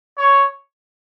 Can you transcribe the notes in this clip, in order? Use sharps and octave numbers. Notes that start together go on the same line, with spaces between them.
C#5